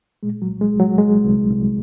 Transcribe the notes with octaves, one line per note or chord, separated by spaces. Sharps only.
A#2 G#3
F#3
C2
G#3
C2
F#3
C2 G#3
C2
C2